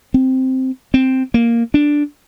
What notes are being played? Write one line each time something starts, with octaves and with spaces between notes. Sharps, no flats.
C4
C4
A#3
D4